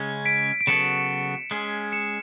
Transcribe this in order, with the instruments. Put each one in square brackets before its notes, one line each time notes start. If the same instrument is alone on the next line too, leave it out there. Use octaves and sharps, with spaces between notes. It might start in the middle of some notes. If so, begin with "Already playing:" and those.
Already playing: [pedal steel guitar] C#3 G#3 C#4
[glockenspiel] B6 D7
D7
[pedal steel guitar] C#3 F#3 B3 F#4 A4 [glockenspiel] C#7 E7
[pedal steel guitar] G#3 C#4 G#4
[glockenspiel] C#7 E7